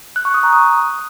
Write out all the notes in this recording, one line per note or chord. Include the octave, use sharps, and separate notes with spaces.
F#6
C#6
D#6
A#5
D#6